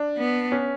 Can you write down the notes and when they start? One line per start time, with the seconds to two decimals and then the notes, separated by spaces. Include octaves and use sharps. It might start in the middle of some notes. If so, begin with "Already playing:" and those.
Already playing: D4
0.18 B3
0.52 C#4